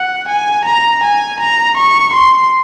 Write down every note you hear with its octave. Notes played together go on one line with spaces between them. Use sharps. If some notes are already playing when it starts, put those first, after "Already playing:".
Already playing: F#5
G#5
A#5
G#5
A#5
C#6
C6